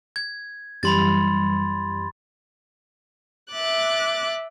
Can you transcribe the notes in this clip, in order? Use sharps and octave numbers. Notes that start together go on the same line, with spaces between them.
G#6
F#2 E3 G3 B5 C6 A6
E5 D6 F#6 A6